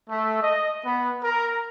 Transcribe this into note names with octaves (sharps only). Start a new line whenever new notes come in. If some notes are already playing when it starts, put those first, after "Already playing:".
A3
D#5
B3
A#4